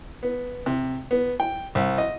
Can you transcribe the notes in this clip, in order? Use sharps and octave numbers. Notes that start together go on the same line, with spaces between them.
B3
C3
B3
G5
C2
D#5